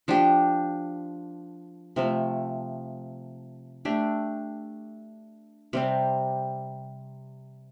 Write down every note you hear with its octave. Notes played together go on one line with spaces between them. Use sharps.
F3 D4 G4
C3 F3 A3
A3 D4 G4
C3 G3 C4